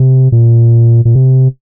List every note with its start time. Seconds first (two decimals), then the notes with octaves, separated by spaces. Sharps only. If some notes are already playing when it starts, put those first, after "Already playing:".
Already playing: C3
0.32 A#2
1.05 A#2
1.15 C3